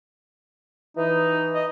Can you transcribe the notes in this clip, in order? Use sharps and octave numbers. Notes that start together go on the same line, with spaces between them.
E3 D#4
D#5